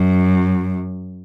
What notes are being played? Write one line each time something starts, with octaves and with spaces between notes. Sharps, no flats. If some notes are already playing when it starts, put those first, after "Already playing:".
Already playing: F#2